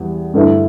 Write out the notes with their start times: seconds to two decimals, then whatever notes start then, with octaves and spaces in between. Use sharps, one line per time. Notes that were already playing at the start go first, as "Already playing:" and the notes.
Already playing: E2 G3 B3
0.34 G2 D3 A3 E4 B4